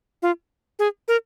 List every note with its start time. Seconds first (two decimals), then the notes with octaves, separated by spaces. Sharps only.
0.22 F4
0.79 G#4
1.08 A#4